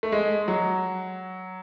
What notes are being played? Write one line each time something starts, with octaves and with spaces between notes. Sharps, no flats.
A3
G#3
F#3